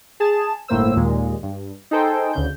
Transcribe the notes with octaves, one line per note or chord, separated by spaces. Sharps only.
G#4 A5 E7
G1 A2 A#3 C5 E6
D#2 A#2 G#3
G2
D#4 G#4 A4 C5 G5
D2 C#3 G6